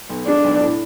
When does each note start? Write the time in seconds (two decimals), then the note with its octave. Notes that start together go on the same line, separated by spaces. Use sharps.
0.09 B1
0.26 G#3 D4
0.44 B1
0.60 A2